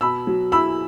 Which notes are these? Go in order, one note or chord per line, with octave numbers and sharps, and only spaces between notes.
B2 B5 E6
F#3
E4 B5 E6